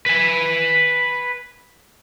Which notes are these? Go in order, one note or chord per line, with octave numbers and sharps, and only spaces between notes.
B4 G#5